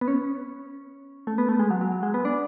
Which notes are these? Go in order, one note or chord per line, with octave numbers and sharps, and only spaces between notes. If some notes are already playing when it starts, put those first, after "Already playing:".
B3
C#4
A3
B3
A3
G#3
F#3
F#3
F#3
G#3
B3
D4